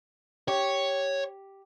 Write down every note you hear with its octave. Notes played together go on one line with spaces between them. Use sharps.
G4 C#5